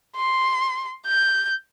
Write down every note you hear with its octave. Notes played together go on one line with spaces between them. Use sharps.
C6
G6